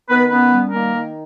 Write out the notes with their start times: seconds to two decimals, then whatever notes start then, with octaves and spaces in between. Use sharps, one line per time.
0.09 D#3 B3 B4
0.30 B3 C#4 B4
0.51 G3
0.72 D#3 A#3 A#4
0.93 D#3